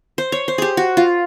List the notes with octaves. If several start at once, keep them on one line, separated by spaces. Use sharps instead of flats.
C5
C#5
C5
G4 G#4
F#4
F4